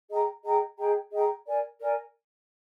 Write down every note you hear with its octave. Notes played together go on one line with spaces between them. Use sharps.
G#4 D#5 G5 A#5
G#4 D#5 G5 A#5
G#4 D#5 G5 A#5
G#4 D#5 G5 A#5
A#4 D5 G#5
A#4 D5 G#5